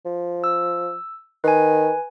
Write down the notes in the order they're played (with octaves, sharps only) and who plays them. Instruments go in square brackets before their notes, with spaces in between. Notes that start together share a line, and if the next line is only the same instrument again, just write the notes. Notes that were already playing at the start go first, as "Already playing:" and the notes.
[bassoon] F3
[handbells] E6
[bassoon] D#3 [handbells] B4 G#5